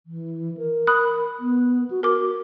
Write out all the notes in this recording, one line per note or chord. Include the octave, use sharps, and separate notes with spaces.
E3
A#4
B5 D#6 F#6
B3
F#4
F#4 A#4 D6